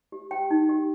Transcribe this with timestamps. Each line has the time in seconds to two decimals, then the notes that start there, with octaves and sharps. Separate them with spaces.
0.12 G4
0.31 G4 G5
0.51 D#4
0.69 G4